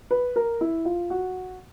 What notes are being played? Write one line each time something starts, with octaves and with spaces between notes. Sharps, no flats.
B4
A#4
E4
F4
F#4